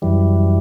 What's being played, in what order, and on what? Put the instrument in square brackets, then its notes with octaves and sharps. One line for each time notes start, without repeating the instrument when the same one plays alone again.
[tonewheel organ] F#2 E3 G3